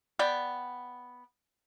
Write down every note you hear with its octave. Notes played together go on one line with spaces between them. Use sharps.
B3 D5 G5